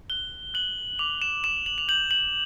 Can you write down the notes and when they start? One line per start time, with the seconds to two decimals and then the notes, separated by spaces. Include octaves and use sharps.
0.10 F#6 G7
0.54 F#6 F#7
0.99 D6 F7
1.22 E7
1.44 D6 E7
1.66 F#7
1.78 F7
1.88 G6 F#7
2.11 F#7